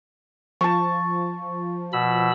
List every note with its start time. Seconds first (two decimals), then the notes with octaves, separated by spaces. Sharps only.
0.61 F3 A5 C#6
1.93 B2 B5 E6